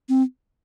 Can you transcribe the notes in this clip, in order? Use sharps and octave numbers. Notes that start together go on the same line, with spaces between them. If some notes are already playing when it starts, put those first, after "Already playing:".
C4